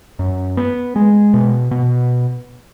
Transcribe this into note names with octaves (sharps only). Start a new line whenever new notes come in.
F#2
B3
G#3
B2
B2